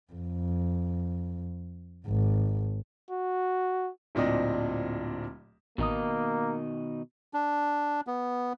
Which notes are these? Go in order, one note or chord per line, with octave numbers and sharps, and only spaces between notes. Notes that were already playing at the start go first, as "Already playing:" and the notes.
F2
G#1
F#4
D1 A#2 C4 D4 D#5
A1 B2 D#3 A#3 D#4 D#6
D4
B3